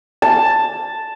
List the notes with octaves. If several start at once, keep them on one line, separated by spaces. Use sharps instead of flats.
A5